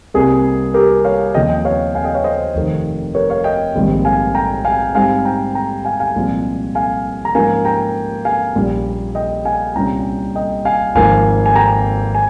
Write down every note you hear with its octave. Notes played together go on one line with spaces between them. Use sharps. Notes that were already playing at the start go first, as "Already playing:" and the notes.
C2 C3 G3 A#3 G#4
G4 A#4
C#5 F5
D#2 C#3 F3 D#5 G5
D#5 G5
C#5 F5
F5 G#5
D#5 G5
C#5 F5
C5 D#5
F1 F2 D#3
A#4 C#5
C#5 F5
D#5 G5
A#1 G#2 D#3 G3 C4
F5 G#5
G5 A#5
F5 G#5
G#2 G3 C4 F5 G#5
G5 A#5
G5 A#5
F5 G#5
F5 G#5
C2 A#2 F3 G#3 C4
F5 G#5
A#5
G#2 F3 A#3 C#4 F5 G#5
G5 A#5
F5 G#5
A#1 A#2 G3 C#4
D#5 G5
F5 G#5
C2 A#2 G3 C#4 G5 A#5
D#5 G5
F5 G#5
G#1 G#2 F3 A#3 F5 G#5
G#5
G5 A#5
G#5